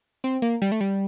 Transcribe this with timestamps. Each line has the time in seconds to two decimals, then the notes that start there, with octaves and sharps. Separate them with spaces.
0.24 C4
0.42 A#3
0.62 G3
0.72 A3
0.81 G3